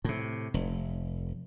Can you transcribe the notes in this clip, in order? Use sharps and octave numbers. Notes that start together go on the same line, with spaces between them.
A2 C3
F1